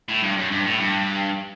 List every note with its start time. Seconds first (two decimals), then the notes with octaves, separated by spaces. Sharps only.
0.08 A2
0.22 G2
0.37 F#2
0.50 G2
0.65 A2
0.79 G2